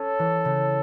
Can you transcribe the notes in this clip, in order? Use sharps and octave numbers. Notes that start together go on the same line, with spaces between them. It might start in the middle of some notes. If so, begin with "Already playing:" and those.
Already playing: C#4 A4
E3
C#3